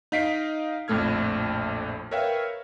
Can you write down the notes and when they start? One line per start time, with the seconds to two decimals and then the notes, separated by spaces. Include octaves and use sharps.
0.12 D#4 D#5 F5 B6 C7 D7
0.88 A#1 F2 A2 A3 F6 G#6
2.11 A#4 B4 C#5 E5 F5 G5